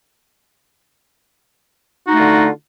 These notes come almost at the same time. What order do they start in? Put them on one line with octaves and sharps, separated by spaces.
F#4 D#4 A3 F4 D3